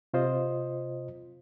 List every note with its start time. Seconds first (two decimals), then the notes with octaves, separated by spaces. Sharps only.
0.14 C3 F4 C5 D#5